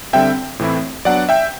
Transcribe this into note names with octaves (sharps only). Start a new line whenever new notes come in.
D3 G3 C4 E5 G5
A2 E3 A3 C4 E4
F#3 B3 D4 D5 F#5
E5 G5